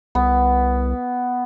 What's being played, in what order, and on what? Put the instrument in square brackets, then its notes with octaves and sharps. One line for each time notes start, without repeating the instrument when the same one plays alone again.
[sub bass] C2 [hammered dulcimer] B3